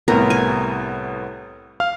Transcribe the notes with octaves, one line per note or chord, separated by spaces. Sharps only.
C2 A2 B3 A#4
G#5
F5 F6